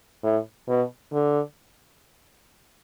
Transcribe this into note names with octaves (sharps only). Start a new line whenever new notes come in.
A2
B2
D3